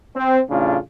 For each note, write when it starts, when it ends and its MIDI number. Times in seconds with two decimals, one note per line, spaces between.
0.16 0.41 60
0.50 0.77 33
0.50 0.77 45
0.50 0.77 49
0.50 0.77 62
0.50 0.77 65